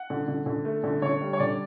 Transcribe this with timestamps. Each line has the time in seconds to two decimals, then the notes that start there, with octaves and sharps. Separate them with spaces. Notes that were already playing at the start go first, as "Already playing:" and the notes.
Already playing: F#5
0.10 D3
0.28 D3
0.46 D3
0.65 A3
0.84 D3
1.02 D3 C#5
1.21 G3
1.33 C#5
1.40 D3 D5